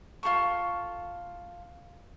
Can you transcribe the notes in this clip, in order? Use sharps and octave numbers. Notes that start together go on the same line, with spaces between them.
F4 G#4 A4 C#6